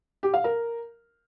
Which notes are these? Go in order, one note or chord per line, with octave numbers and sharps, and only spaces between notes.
G4
F5
A#4